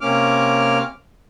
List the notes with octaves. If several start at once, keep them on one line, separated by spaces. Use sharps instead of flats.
C3 A#3 C#4 D6 F6